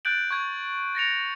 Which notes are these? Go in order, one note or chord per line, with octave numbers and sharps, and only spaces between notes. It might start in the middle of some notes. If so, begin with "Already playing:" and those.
F#6 G6 A6 D7 F#7
C#6 G#6
A6 A#6 C#7 F7